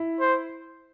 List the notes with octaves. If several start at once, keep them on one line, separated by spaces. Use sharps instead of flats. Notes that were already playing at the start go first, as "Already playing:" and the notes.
Already playing: E4
C5